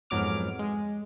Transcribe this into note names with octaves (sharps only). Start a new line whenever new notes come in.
F2 G#2 F#3 B3 D6 F6
G#3